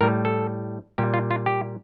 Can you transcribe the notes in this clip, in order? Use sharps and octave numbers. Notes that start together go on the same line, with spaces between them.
A2 G3 A#4
A4
A#2 G3 G4
F4
F4
G4